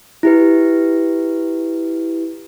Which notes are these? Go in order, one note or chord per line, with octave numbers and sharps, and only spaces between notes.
E4 G4 B4